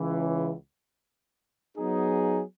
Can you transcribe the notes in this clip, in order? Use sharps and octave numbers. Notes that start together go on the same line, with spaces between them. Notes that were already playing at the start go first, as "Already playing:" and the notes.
Already playing: C#2 C#3 E3
F#3 B3 D#4 G#4